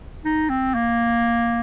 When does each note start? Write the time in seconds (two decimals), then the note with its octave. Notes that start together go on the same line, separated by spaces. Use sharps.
0.25 D#4
0.49 C4
0.75 A#3